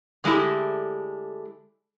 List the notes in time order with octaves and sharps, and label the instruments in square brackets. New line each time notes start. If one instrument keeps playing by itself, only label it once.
[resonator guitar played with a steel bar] D3 G#3 A3 E4 G4